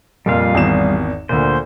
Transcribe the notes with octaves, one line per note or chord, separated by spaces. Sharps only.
F2 A#2 G3 F4 F5
G#1 E2 E7
D2 A#2 C5